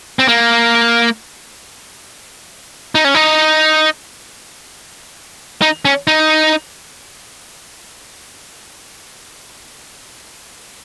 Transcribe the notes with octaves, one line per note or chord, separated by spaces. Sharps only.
C4
A#3
D#4
C#4
D#4
D#4
C#4
D#4